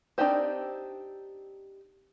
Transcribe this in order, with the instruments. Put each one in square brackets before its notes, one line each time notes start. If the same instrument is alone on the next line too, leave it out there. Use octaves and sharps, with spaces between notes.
[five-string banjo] C4 D4 D#4 G4 C5